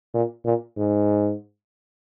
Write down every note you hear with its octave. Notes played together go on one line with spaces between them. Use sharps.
A#2
A#2
G#2